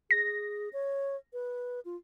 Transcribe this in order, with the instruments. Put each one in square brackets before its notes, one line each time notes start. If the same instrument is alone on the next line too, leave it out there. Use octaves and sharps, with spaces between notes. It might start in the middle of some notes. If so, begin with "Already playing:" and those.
[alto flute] G#4 [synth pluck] A#6
[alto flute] C#5
B4
F4